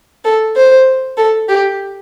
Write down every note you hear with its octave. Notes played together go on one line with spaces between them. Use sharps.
A4
C5
A4
G4